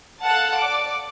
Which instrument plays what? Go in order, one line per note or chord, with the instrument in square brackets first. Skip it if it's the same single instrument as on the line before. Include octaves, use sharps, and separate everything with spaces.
[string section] A4 F5 F#5 A5
D5 D6